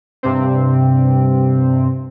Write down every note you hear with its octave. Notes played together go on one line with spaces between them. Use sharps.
G2 C3 C4